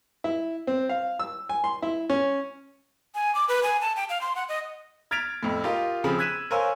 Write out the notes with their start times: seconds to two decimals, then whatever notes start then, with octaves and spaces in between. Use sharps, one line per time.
0.24 E4
0.67 C4
0.89 F5
1.19 E6
1.49 G#5
1.64 C6
1.83 E4
2.10 C#4
3.15 G#5
3.35 D6
3.49 B4
3.63 G#5
3.81 A5
3.96 G5
4.09 F5
4.21 C6
4.36 F#5
4.49 D#5
5.11 F6 G#6 A6 B6 D7 F7
5.43 F2 A2
5.64 F4 G4 A#4 D#5 F5
6.04 C#3 F3 C4 G#4 B5
6.19 E6 F#6 G#6 B6 D#7 E7
6.51 A#4 C5 C#5 F5 G#5 E6